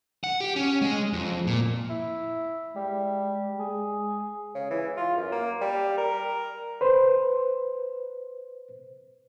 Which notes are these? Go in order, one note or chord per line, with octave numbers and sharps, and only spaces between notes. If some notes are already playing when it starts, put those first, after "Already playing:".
F#5
G4
C#4
G#3
F2
A#2
E4
G3 G#3
G#3 G#4
C#3
E3
F4
F#2
A#3
G3
A#4
B4 C5